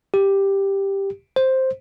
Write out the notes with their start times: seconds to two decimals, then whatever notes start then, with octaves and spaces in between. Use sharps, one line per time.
0.14 G4
1.36 C5